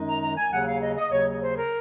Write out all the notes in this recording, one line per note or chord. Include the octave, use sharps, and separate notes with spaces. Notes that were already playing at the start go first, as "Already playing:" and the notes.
Already playing: F#2 D#3 G#3 D#4
A#5
A#5
G#5
D#2 C#3 F#3 F#5
F5
D#5
D#5
D#2 C#3 F#3 C#5
C5
A#4